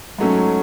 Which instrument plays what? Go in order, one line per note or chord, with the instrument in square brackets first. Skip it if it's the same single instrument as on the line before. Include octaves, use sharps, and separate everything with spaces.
[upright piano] G#2 F#3 A3 C#4